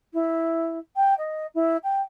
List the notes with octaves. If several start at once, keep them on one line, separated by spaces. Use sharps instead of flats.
E4
G5
D#5
E4
G5